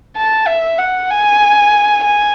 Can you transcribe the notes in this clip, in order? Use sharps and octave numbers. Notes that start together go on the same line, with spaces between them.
A5
E5
F#5
G#5
G#5